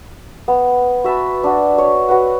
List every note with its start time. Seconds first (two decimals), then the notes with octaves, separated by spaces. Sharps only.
0.48 B3
1.04 F#4 E5 A5 B5
1.44 D4 F#4
1.78 C#5
2.08 F#4 B4 F#5